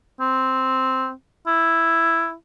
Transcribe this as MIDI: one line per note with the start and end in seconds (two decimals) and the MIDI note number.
0.20 1.11 60
1.47 2.33 64